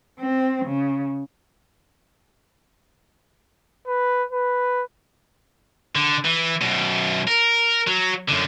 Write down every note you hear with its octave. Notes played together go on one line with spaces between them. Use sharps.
C4
C#3
B4
B4
D3
E3
F#2 B2
A#4
F#3
F#2 D3